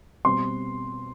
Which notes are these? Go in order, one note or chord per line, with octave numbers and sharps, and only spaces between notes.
B2 G3 C4 C6